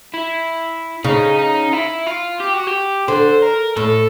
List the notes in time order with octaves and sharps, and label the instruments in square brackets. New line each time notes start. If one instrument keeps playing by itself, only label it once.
[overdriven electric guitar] E4
[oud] C#3 [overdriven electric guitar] D#4
[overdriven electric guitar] D#4
E4
F4
G4
F#4
G4
[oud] D3 [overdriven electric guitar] C5
[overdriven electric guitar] A#4
[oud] A2 [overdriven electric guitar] A4